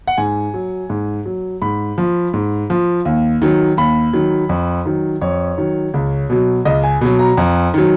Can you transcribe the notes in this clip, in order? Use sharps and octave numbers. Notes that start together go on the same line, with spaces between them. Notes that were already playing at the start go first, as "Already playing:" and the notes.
F#5
G#2 G#5
F#3
G#2
F#3
G#2 B5
F3
G#2
F3
D#2
D#3 F#3
D#2 B5
D#3 F#3
F2
D#3 F#3
F2 C#5
D#3 F#3
C#2
B2 F#3
C#2 D#5
G#5
B2 F#3
A#5
F2
D#3 F#3